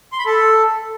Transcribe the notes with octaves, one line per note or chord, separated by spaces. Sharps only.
C6
B5
A4